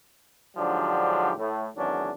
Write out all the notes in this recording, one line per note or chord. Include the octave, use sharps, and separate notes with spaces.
G#2 D3 F3 F#3 D4 G4
A2
E2 G#2 D#3 F#3 C#4 D4